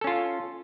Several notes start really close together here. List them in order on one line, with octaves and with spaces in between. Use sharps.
A4 C#4 F4